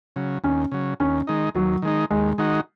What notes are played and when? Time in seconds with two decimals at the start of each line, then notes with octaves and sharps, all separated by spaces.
0.16 C#3 F#3
0.44 D#2 C#4
0.72 C#3 F#3
1.00 D#2 C#4
1.27 D#3 G#3 D#4
1.55 D#2 F#3
1.82 D#3 G#3 D#4
2.10 D#2 G#3
2.38 D#3 G#3 D#4 F#4